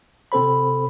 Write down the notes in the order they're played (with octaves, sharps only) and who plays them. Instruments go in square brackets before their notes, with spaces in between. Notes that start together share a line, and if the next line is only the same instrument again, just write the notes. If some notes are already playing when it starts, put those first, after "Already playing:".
[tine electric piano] C3 C4 A4 C5 B5